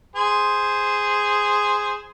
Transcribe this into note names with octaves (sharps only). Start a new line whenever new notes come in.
G#4 C5